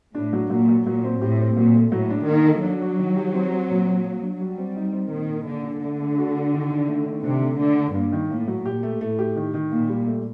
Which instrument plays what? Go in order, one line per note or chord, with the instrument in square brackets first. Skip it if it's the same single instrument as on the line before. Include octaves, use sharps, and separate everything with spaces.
[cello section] A2 [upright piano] D4
[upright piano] F#3
[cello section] A#2 [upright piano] F#3
[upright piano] F#3
[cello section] A#2 [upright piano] F#3
[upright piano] C4
[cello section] A2 [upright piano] G4
[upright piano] C4
[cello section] A#2 [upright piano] F#3
[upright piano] A3
[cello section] A2 [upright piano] F#3
[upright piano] D4
[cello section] D#3 [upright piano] A#3
[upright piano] A4
[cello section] F#3 [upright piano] D4
[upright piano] F#4
D#3
G4
C4
C4
A#2
A#2
A#3
D4
[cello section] G3 [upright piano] F#4
[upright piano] C4
D#4
C4
[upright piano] A#2 [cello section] D#3
[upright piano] A#2
[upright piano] A#2 [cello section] D3
[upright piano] D4
[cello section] D3 [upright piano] A3
[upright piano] A3
F#4
F#4
D#3
D#3
A3
D#3
[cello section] C3 [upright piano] D4
[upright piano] A3
[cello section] D3 [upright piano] A3
[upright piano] D4
[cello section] G2 [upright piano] A#3
[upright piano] D#3
[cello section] A2 [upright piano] A#3
[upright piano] F#3
[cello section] A#2 [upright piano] G4
[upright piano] A3
[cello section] A2 [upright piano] A3
[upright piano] G4
D#3
D#3
[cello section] A#2 [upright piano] A#3
[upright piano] G3
A3